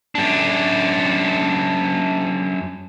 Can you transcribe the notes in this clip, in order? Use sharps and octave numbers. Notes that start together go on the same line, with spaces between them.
F#2 D4